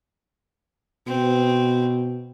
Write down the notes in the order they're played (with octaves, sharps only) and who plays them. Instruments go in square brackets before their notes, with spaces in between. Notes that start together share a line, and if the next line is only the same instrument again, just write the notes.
[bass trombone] B2 [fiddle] C4